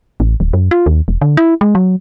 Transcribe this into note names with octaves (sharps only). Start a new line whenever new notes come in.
A1
D1
F#2
F4
D#2
E1
D3
E4
G#3
F#3